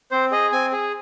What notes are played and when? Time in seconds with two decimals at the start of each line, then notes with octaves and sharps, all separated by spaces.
0.11 C4 C5
0.31 G#4 D#5
0.52 C4 G#5
0.72 G#4